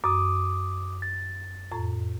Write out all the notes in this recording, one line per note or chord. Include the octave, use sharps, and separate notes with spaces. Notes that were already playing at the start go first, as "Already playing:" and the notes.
F#2 D6 D#6
A6
F2 A2 A#5